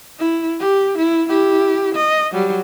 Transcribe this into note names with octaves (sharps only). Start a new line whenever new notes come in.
E4
G4
E4
E4 G4
D#5
F#3 G3